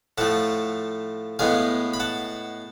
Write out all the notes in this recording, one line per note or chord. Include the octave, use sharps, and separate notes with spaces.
A2 F3 A3 F#5 A5
A2 G#3 B3 F5 G#5
B5
F#5 A5